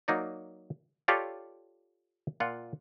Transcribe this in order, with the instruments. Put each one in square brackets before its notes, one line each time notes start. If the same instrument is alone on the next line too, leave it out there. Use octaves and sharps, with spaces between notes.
[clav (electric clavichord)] F#3 A#3 D#4 D5
F4 G4 A4 C#5 D5 F5
A#2 F4 F#5